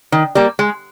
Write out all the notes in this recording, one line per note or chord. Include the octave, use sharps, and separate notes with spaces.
D#3
G3 A#3
G#3